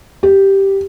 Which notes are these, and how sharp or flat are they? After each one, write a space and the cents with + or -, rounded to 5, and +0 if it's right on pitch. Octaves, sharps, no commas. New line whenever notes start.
G4 -5